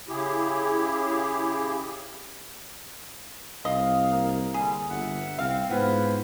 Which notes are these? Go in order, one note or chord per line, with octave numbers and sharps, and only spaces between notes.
C#3 E4 G4 G#4
C2 D#5 F5
A#3
D3 G3 G#4
G1 E5 F#5
C2 C4 F5
G#2 B3 E4 F4 B4 C5